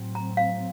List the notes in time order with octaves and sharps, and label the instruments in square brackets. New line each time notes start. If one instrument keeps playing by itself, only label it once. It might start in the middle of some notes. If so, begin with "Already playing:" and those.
Already playing: [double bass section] A2 F#3 C4
[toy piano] A#5
F5